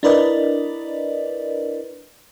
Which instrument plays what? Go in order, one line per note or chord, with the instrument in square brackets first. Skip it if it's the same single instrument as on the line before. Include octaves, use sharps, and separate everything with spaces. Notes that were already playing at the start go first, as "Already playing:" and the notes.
[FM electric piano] D4 E4 A#4 B4 D5 D#5